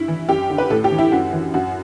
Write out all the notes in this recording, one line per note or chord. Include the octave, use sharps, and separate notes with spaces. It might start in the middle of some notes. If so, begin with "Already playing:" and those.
Already playing: G2 E4
E3
F#2 G4
D3
B4
A2 A4
G4
E3
E4
F#2 F#4
E3
F#2 F#4